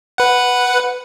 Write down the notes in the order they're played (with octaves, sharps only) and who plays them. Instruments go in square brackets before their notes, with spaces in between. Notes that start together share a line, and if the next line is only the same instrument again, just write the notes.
[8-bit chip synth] B4 F#5